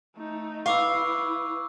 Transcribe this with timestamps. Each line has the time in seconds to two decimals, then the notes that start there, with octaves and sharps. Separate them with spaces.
0.16 A3 D#4
0.66 E4 B4 F5 C#6 D6 E6